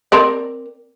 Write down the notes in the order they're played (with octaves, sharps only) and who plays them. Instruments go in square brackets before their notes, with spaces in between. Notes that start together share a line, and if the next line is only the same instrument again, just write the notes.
[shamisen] C4 A#4 D5